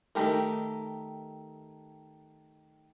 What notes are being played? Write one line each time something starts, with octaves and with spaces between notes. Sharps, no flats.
D#3 E3 A3 G4 A#4